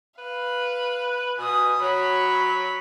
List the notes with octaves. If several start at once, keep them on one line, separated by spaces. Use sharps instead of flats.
B4 F5
B2 G#5 D#6
F#3 C#5 B5